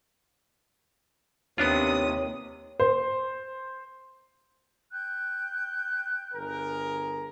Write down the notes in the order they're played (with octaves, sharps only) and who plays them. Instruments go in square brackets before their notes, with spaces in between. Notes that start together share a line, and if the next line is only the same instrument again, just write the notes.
[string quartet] D#2 C3 D#6 [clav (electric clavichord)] B3 D4 F4 [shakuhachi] C#5
[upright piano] C5
[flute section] G5 F#6 G6
[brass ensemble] G1 G#4 A#4